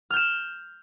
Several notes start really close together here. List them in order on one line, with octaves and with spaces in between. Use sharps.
F6 G6 E7